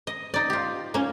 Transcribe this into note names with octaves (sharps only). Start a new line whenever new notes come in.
D#5
D#4 D5
F4 G4
A#3 C#4